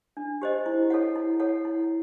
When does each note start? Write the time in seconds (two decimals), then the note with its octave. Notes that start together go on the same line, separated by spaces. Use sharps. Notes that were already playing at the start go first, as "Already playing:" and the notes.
0.17 D4
0.42 G4 C5 D#5
0.66 E4
0.90 A4 C#5 F#5
1.16 E4
1.40 A4 C#5 F#5
1.65 E4